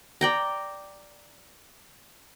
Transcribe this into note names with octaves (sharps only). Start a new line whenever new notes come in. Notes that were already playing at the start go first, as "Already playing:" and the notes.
D5 G5 A#5